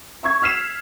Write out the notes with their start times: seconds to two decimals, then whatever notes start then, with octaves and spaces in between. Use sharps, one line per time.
0.23 E5 C#6 G#6
0.42 E6 F6 B6 C7 E7